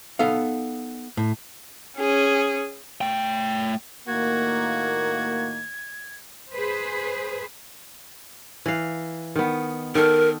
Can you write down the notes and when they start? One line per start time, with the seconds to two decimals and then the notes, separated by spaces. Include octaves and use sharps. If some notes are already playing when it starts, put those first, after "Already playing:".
0.19 B3 D#4 A4 F5
1.17 A2
1.98 C#4 G#4
3.01 A3 G5
4.08 A2 D#3 A#3 F#4 G#6
6.53 G#4 B4 C5
8.66 E3 F5
9.36 D#3 B3
9.95 D#3 A4 A#4